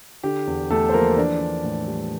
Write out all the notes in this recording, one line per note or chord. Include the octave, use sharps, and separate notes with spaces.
D3 G4
E2
E2 A3 A4
C5
F3 A#3 A#4
E3 D4 D5
D4
A2
G3